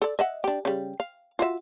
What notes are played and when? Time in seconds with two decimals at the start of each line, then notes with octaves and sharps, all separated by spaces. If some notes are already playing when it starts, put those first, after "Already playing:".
0.02 A4 D5
0.19 D#5 E5 F#5
0.44 D4 G4
0.65 C#3 G3
1.00 F5
1.39 F4 F#4 E5